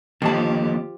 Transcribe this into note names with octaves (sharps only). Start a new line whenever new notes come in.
F2 D3 D#3 F3 A#3 G4 A5